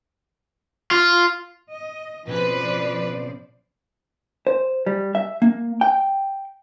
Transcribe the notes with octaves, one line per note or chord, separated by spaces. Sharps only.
F4
D#5
B2 F3 C4 C#4 B4 C5 D5
C5
G3
E5
A#3
G5